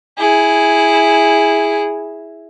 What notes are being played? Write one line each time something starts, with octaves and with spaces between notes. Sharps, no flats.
E4 G#4